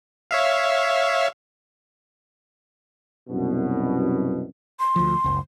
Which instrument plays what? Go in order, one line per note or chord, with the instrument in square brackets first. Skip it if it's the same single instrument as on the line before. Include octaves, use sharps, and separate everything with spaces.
[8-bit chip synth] C#5 E5 F5
[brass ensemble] C2 F#2 B2
[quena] C6
[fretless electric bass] D2 F3
F#1 C#2